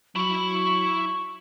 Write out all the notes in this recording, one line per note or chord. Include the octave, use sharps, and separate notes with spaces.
F#3 E4 B5 C#6